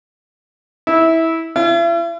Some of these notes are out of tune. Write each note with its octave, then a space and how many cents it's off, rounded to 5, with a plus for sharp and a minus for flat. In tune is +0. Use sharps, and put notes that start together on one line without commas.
E4 -15
E4 +45